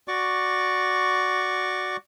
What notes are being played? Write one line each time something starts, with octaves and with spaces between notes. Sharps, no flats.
F#4 D5 C#6 D6